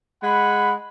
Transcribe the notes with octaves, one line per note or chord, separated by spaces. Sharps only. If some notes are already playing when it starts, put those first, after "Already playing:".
G#3 F#5 B5